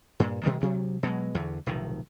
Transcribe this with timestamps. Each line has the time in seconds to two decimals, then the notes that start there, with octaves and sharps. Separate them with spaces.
0.20 G2 A#2
0.43 B2 D#3 G3 G#3
0.61 D2 C3 F#3
1.03 B2 F#3 G#3
1.35 E2 D3
1.66 F1 B1 A2 D#3